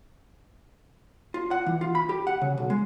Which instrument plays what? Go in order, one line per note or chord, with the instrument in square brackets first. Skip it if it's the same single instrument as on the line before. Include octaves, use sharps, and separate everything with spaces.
[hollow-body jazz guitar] F4
F#5
E3
F4
B5
G4
F#5
C#3
B1
G#3